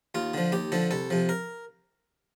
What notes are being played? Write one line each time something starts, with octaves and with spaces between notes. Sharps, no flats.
D#2 F4
D3 F3
D#2 G4
D3 F3 A4
C2 A4
C3 F3
A#4